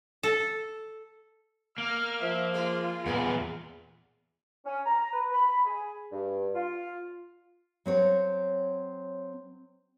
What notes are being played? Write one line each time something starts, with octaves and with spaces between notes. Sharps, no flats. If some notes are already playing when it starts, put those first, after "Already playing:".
A4
A#3 F6
F3 E5
G#3 F4
E2 A#2 G#3 B3
C#4
A#5
B4
B5
G#4
G2
F4
F#3 C4 C#5